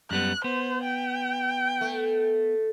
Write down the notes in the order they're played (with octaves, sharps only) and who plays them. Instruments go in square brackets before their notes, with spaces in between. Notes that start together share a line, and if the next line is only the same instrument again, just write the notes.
[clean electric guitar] F#2 G3 B3 [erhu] F#6
[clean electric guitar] B3 [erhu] C5
[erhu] G5
[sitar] A3